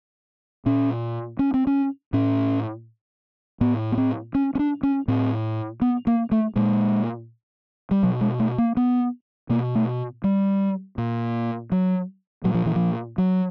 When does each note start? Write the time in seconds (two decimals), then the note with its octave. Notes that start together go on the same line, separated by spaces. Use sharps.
0.66 A#2 C#4
1.39 C#4
1.54 C4
1.67 C#4
2.13 A2 C#4
3.61 A2 B3
3.92 B3
3.97 C4
4.35 C#4
4.55 C#4
4.59 D4
4.83 C#4
5.08 A2 C4
5.82 B3
6.07 A#3
6.32 A3
6.56 A#2 G#3
7.91 G3
8.03 B2 F#3
8.21 G#3
8.40 A3
8.58 A#3
8.77 B3
9.50 B2 A#3
9.75 A3
10.24 G3
10.98 A#2
11.72 F#3
12.44 A#2 F#3
12.54 F3
12.66 E3
12.76 F3
13.18 F#3